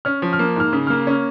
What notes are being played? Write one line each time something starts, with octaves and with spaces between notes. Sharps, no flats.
C#4 F6
F3
F6
A#3
G#2 F6
C#3
A#3 F6
C#4